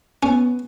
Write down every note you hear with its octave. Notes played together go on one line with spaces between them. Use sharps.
B3 C#4